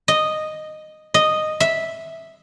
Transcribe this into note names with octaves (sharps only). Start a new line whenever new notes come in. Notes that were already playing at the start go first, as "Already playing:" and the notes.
D#5
D#5
E5